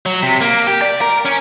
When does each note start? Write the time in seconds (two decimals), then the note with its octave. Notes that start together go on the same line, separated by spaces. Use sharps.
0.06 F#3
0.23 C3
0.41 A#3
0.67 G4
0.82 D5
1.01 A#4
1.25 C#4